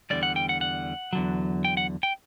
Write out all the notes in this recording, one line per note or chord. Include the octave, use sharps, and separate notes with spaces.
E2 D3 G3 D5
F#5
G5
F#5
F#5
E2 D3 F#3
G5
F#5
G5